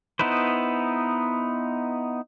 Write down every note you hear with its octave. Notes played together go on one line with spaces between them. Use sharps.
B3 D#4 E4 B4 C5